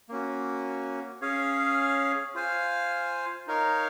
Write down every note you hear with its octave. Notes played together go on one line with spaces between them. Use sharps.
A#3 C#4 F#4
C#4 G#4 C#5 F5
F4 C5 F5 G#5
D#4 A#4 C#5 F5